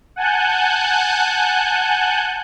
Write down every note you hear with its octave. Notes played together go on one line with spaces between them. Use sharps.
F#5 G#5 A5 F#6 G6